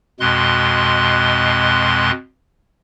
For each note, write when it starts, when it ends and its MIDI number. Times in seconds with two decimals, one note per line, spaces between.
0.20 2.11 41
0.20 2.11 47
0.20 2.11 56
0.20 2.11 84
0.20 2.11 90